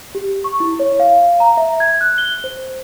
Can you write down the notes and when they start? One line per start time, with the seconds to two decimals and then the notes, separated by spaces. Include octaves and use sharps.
0.15 G4
0.44 C#6
0.60 E4
0.80 C#5
1.00 F5
1.40 A#5
1.57 E5
1.80 G#6
2.01 F#6
2.18 G7
2.44 C5